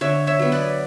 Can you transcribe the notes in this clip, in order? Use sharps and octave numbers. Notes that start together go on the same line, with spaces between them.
D3 C#5 E5
C#5 E5
F#3 B3
B4 D5